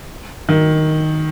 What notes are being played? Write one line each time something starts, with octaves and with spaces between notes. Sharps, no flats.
D#3